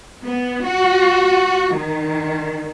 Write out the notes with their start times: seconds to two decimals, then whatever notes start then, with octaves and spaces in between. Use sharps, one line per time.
0.23 B3
0.63 F#4
1.73 D#3